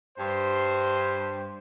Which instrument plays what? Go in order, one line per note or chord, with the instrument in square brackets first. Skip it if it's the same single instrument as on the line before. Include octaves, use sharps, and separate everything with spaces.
[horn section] G2 C5